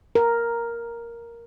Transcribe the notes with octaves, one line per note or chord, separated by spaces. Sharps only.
A#4